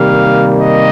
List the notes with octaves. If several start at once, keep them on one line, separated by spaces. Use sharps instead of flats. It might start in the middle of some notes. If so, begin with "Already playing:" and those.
Already playing: C3 D#3 G3 A#3 F5
D#5